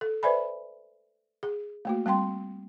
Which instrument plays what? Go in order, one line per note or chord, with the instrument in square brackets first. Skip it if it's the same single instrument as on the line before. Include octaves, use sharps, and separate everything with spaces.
[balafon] A4
B4 C5 D5 E5 G#5 B5
G#4
A3 A#3 F#4
G3 C4 G5 C6